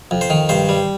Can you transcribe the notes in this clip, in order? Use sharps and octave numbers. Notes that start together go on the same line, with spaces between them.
F2
C5
D#3
G2 C5
G3